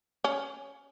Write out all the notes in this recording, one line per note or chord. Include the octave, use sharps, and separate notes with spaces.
C#4